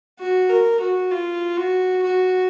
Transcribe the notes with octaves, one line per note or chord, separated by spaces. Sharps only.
F#4
A#4
F#4
F4
F#4
F#4